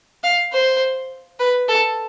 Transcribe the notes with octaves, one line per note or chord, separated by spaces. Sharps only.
F5
C5
B4
A4